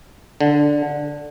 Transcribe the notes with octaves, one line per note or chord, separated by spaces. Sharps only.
D3